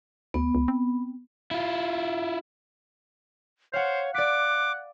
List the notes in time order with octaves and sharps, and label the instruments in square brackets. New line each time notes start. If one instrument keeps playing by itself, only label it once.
[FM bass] D2 [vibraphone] B3
[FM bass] C#2
C4
[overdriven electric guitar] E4 F4
[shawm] C5 [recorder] C#5 [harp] F5 F#5
[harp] D5 B6 [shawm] F#5 [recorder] D6